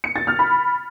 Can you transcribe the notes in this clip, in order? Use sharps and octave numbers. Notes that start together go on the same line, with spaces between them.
C#7
A6
F6
B5